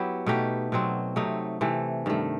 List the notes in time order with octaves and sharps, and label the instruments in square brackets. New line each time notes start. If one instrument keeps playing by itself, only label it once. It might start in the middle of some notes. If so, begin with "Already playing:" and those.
Already playing: [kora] F#3 B3 E4 G4
B2 A3 D#4 G4
B2 F#3 C4
C3 F#3 A3 D#4
C3 E3 A3
G2 D#3 A3